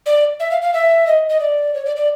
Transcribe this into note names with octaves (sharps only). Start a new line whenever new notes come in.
D5
E5
F5
F5
E5
D#5
D#5
D5
C#5
D5
D5